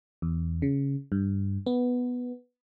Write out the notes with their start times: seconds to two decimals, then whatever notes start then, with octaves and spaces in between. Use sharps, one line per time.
0.22 E2
0.62 C#3
1.12 G2
1.66 B3